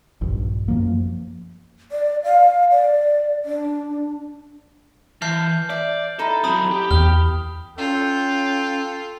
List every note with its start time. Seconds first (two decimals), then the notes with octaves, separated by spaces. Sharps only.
0.21 A#1 G2
0.68 F#2 F3 A#3
1.92 D5
2.24 F5
2.71 D5
3.45 D4
5.22 E3 A5 F6 G6 C7
5.70 D5 E5
6.19 D#4 E4 A4
6.44 F#3 C4 A5 B5 D#6
6.71 G4
6.91 E2 G5 F6 G7
7.78 C#4 F4 A4 G5